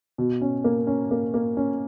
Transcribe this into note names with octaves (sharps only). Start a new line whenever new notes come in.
B2
C#4
A#3
C#4
A#3
A#3
C#4